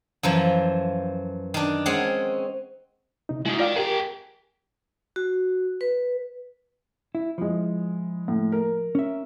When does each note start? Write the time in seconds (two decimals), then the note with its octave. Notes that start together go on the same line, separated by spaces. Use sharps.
0.23 F#2 E3 F3
1.54 D#3 D4
1.86 G#3 C4 C#4 G#4 F#5
3.29 C3 D#4
3.46 G#3 D#4 E4 F#4
3.59 F4 A#4 D5 F5 G5
3.76 G4 G#4 A#4 G5
5.16 F#4
5.81 B4
7.15 E4
7.38 F3 G#3 E4
8.28 A2
8.52 A#4
8.95 C#4 E5